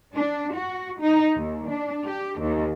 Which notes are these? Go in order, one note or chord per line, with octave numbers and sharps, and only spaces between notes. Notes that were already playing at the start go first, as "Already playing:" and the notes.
D4
F#4
D#4
D#2
D4
G4
D#2